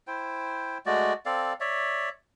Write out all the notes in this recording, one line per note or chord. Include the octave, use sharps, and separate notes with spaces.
E4 C5 G5
G#3 A3 F#4 D5
C4 A4 D5 F5
C#5 D5 E5